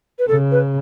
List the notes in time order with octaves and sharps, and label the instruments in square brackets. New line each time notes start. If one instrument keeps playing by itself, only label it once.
[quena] B4
[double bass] C#3 [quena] A4
[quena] B4